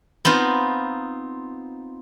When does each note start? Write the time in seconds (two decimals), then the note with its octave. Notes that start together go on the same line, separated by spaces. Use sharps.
0.25 B3 C4 D#4 F4